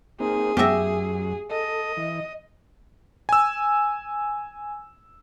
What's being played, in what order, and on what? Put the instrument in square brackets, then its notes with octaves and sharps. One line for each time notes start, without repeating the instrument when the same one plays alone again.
[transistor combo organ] A#3 C4 D#4 [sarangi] G#4
[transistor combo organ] F#2 [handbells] B3 G5 A#6 [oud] G4 E5
[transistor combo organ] A4 [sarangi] D#5
[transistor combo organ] E3
[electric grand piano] G#5 E6